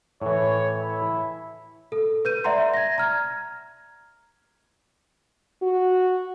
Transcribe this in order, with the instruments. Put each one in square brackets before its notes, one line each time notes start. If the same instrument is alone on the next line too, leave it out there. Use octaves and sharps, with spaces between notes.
[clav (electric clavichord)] A2 E3 [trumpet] C#5
[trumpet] E4
[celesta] A4
B4 G6 D#7
D5 E5 F#5 A#5 C6
G#6 A#6
A#5 F6 G#6
[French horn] F#4